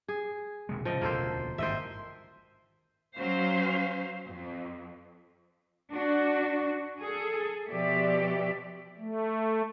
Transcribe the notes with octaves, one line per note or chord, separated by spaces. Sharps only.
G#4
E1 C3 G#3
A2 C#3 F3 D#5
E1 D2 C#3 A#3 A4 C5
G#1 G2 E3 C5 D#5 E5
F#3 C#4 C5 F5
F2
D4 F#4
G#4 A4
B2 F3 G4 D5 E5
A3